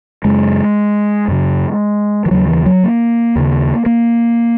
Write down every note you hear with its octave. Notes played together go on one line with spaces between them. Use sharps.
F#2 C#3 G#3
F#2 C#3
E3
D#2 C#3 F#3
E3
F#3
A#3
D#2 C#3
A#3